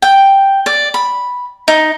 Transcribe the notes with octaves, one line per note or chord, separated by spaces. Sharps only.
G5
D5
B5
D#4